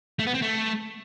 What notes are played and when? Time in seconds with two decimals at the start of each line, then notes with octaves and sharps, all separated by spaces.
0.19 A3
0.27 B3
0.34 C4
0.42 A3